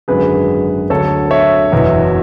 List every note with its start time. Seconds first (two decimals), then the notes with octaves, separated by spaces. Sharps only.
0.08 G#1 F#2 D3 F#3 G#4 B4
0.90 D2 D3 F#3 A4 C#5
1.31 C#5 E5
1.72 F#1 E2 B2 F#3